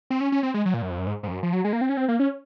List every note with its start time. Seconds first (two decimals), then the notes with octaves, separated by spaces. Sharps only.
0.10 C4
0.21 C#4
0.32 C#4
0.43 C4
0.54 G#3
0.66 F#3
0.74 A#2
0.82 F#2
0.90 F2
0.99 F#2
1.07 G#2
1.23 G#2
1.28 F2
1.31 F#2
1.43 F3
1.53 F#3
1.64 G#3
1.73 A#3
1.81 C4
1.89 C#4
1.97 C4
2.08 A#3
2.19 C#4